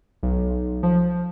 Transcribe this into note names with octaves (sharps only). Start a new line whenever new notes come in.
B1
F3